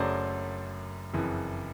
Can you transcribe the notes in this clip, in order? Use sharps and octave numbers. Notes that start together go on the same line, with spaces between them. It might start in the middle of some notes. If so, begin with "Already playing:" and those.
Already playing: F#1 F#2 C#3 F#3 A3 C5 D5
F#1 F2 C#3 E3